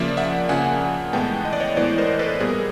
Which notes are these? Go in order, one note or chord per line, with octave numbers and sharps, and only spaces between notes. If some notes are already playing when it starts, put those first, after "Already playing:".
Already playing: C#3 F3 A#3 D5 E5
E5 F#5
C#3 F3 A#3 F#5 G#5
A2 E3 G#3 B3 G5 A5
D#5
D5
C#5 D#5
A2 E3 G#3 B3 C5 D5
A#4 C5
A4 B4
A#2 G3 B3 G#4 A#4